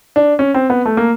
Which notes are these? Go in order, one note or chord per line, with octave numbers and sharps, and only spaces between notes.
D4
C#4
C4
B3
A3
A#3